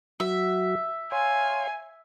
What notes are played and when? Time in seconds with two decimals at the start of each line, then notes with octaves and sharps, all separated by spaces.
0.20 F#3 F#4 E5
1.12 C#5 F5 G#5 C6